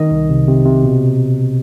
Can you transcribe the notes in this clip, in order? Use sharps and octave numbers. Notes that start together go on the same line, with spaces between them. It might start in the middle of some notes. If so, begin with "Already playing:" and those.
Already playing: D#3 D#5
C2
C3
C3
C3
B2